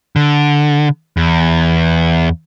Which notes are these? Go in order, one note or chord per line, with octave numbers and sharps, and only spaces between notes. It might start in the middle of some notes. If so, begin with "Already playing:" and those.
D3
E2